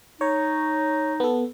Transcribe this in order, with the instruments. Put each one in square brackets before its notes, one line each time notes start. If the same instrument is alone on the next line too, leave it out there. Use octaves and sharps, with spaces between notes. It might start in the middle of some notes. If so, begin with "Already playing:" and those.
[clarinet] D#4 [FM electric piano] C#5
[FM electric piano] B3 A4